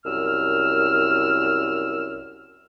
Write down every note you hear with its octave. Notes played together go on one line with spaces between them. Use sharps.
C2 F#2 E6 F6